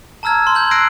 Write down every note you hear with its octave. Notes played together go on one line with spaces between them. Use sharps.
A5 A#5 E6 F6 G#6
C6 G#6
G6 G#6 F#7
E6 F#6 G#6 A#6 C7 D7